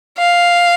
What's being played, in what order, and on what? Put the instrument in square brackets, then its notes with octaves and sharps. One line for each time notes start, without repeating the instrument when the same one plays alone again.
[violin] F5